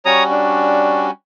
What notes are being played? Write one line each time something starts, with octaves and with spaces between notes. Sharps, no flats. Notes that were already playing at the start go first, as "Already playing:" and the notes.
G3 C#4 F#4 C#5 A#5 D#6
D4